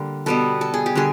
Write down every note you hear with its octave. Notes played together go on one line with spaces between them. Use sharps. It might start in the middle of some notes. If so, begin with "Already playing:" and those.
Already playing: D3 G3 A#3
B2 G3 B3 A4
A4
G#4
G4
D3 G3 G#4